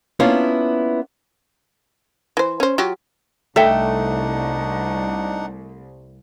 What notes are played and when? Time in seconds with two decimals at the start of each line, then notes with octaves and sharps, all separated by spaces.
0.20 A#3 B3 C#4 D4 E4 F4
2.37 E3 C5
2.60 C#4 C5
2.78 F#3 F4 G4
3.56 C2 A3 D4 D#4 A4 E5 F#5 G5